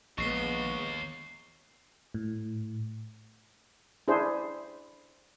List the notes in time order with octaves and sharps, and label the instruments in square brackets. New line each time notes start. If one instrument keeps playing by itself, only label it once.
[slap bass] A#1 [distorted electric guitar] D#2 [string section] G#3 B3 [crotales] C#6 C7 G7
[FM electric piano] A2
[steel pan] D4 E4 G#4 C5